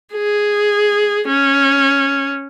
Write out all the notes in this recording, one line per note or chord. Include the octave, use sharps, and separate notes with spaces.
G#4
C#4